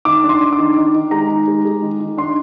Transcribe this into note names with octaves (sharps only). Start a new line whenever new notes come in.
D#3 D6
D4
C6
D4
D6
D#3
D#3
D#3
G#3 A#5
D#3
G#3
G#3
D#3
D#3
D4 C6